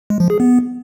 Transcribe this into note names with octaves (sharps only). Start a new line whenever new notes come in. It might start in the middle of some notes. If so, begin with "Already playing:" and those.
G#3
F3
G#4
B3